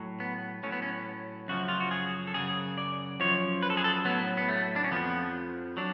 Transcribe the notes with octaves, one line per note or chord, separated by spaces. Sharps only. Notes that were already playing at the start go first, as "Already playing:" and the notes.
Already playing: A2 F#3
B3
A2 F#3 C#4
B3
C#4
F#2 C#3 F3 F#4
F4
F#4
G#4
A4
F#2 C#3 F#3 G#4
D5
F#2 F3 C#5
B4
A4
G#4
A4
A2 F#3 B3
B3
A3
D4
C#4
F2 F3 B3
F#3 D4